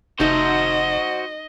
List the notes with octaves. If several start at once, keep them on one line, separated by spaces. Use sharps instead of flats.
F1 D#4 F#4 A4 C5 D#5 E5